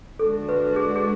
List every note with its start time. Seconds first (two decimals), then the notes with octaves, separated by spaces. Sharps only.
0.19 D3 G#3 D4 F#4 A4
0.49 B4
0.76 G#4
0.96 G#4